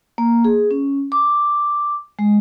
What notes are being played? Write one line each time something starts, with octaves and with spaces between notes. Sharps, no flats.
A#3
G#4
C#4
D6
G#3